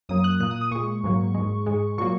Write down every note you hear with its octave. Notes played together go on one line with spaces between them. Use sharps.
F#2 F#3 A#3 D#6
F#6
A#2 A#3 F#6
D#6
D#6
A#2 G#3 C#6
G#2 F#3 A#3
G#2 G#3
G#2 G#3
A#2 F#3 A#3 C#6